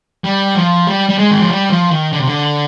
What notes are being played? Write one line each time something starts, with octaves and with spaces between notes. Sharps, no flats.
G3
F3
G3
G3
G#3
D#3
F3
G3
F3
D#3
D3
C3
D3